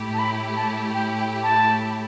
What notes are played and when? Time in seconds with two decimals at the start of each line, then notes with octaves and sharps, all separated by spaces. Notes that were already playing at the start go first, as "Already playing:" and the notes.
Already playing: A2 A3 E4 G4
0.14 A5
0.19 B5
0.57 A5
0.94 G5
1.19 G5
1.43 A5